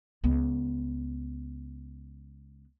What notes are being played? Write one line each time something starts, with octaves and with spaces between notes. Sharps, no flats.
C#2 B3